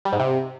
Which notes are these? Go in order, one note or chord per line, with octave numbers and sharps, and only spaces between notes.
G3
G#2
C3